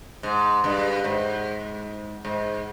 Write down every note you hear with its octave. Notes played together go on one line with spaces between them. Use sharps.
G#2
G2
G#2
G#2